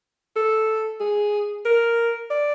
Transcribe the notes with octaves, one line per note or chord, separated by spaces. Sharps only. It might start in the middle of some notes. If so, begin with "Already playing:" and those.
A4
G#4
A#4
D5